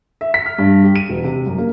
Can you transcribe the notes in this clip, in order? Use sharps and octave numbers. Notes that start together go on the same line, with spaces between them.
E5
B6
F6
G2
G4
D#7
E1
C3
F#2
A#3